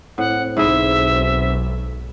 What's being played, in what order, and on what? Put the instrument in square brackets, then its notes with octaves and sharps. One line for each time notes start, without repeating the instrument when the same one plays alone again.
[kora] A2 [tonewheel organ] C4 [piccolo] F#5
[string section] B1 [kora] G#2 E4 G#4 [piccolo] E5